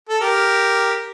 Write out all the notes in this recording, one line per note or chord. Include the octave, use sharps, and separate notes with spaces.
A4
G4 A#4